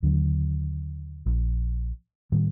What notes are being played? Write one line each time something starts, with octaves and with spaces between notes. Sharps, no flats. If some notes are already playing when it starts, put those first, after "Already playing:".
D#2 D3 F#3
A#1
A2 D#3 G3